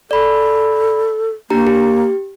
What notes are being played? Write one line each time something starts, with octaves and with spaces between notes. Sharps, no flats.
A4 D5 B5
A#3 D4 G4 A#5
G4